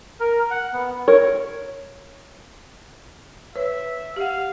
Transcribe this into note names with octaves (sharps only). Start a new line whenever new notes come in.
A#4
F#5
B3
A#4 C#5
B4 C#5 E5
G4 F5 F#5